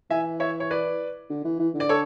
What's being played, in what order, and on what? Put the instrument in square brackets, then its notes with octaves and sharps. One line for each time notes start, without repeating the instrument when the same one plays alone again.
[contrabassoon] E3 [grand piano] E5 G#5
[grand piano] C#5 E5
C#5
B4 D5
[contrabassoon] D3
E3
E3
D3
[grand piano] D5
A4 C#5